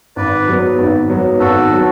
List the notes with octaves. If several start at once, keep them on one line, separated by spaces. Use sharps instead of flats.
G#1 B4 D5
G#2 F#3 B3
G#1
G#2 F#3 B3
G#1 F#4 A4
F#3 B3